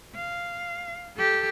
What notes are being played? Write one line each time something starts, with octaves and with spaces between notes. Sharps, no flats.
F5
G4 A4